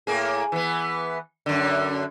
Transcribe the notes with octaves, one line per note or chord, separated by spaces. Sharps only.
A2 A#3 G#4
E3 B3
F#2 D3